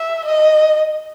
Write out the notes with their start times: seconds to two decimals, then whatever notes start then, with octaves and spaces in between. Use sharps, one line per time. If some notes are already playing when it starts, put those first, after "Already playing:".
Already playing: E5
0.25 D#5